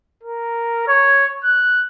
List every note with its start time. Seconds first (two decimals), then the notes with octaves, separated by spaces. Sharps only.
0.23 A#4
0.87 C#5
1.44 F#6